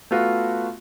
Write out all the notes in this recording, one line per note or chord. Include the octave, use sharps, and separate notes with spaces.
A3 B3 F4 F#4